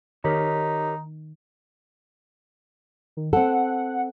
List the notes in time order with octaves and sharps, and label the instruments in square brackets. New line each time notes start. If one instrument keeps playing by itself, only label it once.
[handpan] D#3 [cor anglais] D#4 [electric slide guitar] G4 A#4 C#5
[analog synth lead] D#3
[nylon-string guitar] C4 A4 [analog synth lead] F#5